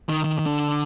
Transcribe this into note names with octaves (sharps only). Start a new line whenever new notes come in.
D#3
D#3
D#3
D3